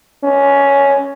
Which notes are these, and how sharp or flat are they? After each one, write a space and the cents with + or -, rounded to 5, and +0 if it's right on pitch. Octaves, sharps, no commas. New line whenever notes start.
C#4 +10